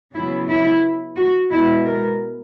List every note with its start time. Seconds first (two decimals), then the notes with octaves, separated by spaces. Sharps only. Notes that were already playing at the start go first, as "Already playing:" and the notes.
0.14 C#3 F#3 B3 E4
0.48 E4
1.17 F#4
1.51 B2 G#3 B3 E4
1.86 A#4